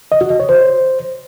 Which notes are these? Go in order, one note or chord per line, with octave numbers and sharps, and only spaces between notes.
D#5
F#4
D#5
C#5
C5